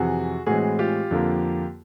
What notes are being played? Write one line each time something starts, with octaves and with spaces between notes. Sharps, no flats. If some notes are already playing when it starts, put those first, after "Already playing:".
Already playing: F2 C3 E3 F#4 G#4
A2 E3 G#3 C4 F#4 G#4
F4 G4
F2 D3 F3 A#3